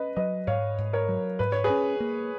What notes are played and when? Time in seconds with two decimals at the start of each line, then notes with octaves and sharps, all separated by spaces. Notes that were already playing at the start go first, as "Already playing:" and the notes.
Already playing: C#4 B4 D#5
0.16 F#3 B4 D#5
0.47 G#2 C#5 F5
0.78 G#2
0.93 A#4 C#5
1.09 F#3
1.39 G#2 B4
1.52 C#5
1.64 G#4 B4
1.70 C#4
2.00 A#3